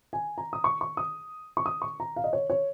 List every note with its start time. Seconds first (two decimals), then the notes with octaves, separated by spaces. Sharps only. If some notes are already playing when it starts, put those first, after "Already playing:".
0.13 G#5
0.38 A#5
0.53 D#6
0.64 C#6
0.81 C#6
0.97 D#6
1.57 C#6
1.66 D#6
1.82 C#6
2.00 A#5
2.16 F5
2.24 D#5
2.33 C#5
2.50 C#5